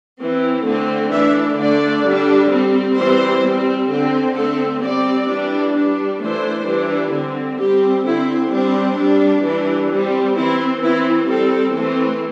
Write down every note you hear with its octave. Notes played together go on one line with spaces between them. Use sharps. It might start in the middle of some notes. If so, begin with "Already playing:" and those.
E3 C4
D3 A3 C4
E3 A3 D4 E5
D3 A3 D4 D5
D3 G3 D4
G3 C4
E3 G3 C4 C5
G3 C4
D3 C4
D3 A3 C4 A4
G3 C4 D5
E3 G3 D4
G3 D4
E3 A3 D4 C5
E3 G3 D4
D3 C4
G3 C4 G4
D3 C4 E4
G3 C4 D4
G3 D4
E3 G3 D4
G3 C4
E3 C4 E4
E3 C4 E4
G3 C4 A4
E3 A3 C4